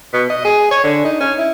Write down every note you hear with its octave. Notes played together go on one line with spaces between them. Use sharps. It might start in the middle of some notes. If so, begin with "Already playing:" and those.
B2
D#5
G#4
C#5
D3
D#4
C#4
E4